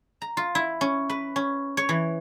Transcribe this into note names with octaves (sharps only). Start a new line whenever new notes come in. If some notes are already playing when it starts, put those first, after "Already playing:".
A#5
F4
E4
C#4
B4
C#4
C#5
E3